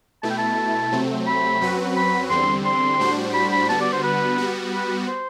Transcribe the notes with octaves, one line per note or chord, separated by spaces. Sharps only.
B2 A3 E4 A5
G5
A5
C3 F#3 A3 C4
B5
F#2 F#3 C4 F#4 B4
B5
E2 D3 G3 C4 C6
C6
A2 G3 D4 F#4 C5
B5
B5
D3 G3 B3 F#4 A5
D5
C5
B4
G3 B3 F#4
B4
C5